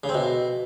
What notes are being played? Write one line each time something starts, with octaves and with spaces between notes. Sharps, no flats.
C#3
C4
B2